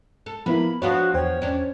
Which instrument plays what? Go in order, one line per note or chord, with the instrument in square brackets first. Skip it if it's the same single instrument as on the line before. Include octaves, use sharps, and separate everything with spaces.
[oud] A4
[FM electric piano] F3 B3 E4 [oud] A#3 [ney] B5
[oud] F3 B3 D4 [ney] F#4 [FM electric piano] C#5 F5 C6
[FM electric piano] E2 C5 G5 [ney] C#5
[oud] C#4 D4